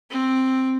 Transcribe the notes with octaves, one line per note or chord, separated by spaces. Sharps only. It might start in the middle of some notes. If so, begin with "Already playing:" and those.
C4